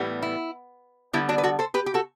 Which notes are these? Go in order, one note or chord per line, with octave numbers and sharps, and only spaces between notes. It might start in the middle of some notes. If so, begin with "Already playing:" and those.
Already playing: A2 E3 G3 B3
E4
D3 G3 B3 E4
D4 F#4
B4
F#4 A4
A4 C5
G4 B4
G4
F#4 A4